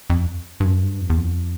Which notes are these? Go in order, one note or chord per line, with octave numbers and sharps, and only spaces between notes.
F2
G2
F#2
G2
F2
E2
F2